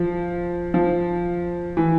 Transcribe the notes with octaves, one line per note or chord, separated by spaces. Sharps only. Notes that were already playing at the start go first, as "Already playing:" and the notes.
Already playing: F3
F3
E3